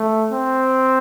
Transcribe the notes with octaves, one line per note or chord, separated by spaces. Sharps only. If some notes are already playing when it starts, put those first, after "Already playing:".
Already playing: A3
C4